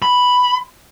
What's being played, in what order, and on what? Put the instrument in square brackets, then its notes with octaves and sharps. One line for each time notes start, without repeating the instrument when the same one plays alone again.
[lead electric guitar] B5